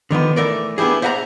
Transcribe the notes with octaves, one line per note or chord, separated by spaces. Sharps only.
D3 D#3 F3 B3
E3 A3 A#4 D5
B3 D4 E4 G4 G#4
C5 E5 F#5 G#5 A#5